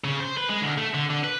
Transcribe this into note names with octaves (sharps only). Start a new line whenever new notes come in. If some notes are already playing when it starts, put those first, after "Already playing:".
C#3
C5
B4
G#3
D2
A3
D3
D3
B4